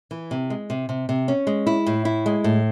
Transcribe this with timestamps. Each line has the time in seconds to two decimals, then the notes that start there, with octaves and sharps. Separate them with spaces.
0.11 E3
0.31 C3
0.50 G#3
0.70 C3
0.89 C3
1.09 C3
1.28 C#4
1.47 G#3
1.67 E4
1.86 A2
2.05 E4
2.26 G#3
2.44 A2